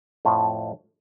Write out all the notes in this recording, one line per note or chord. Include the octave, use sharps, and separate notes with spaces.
F2 A2 F3